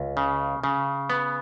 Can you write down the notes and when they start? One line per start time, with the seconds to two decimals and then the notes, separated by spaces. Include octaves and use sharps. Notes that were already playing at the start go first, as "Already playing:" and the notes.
Already playing: C#2
0.17 C#3
0.64 C#3
1.10 B3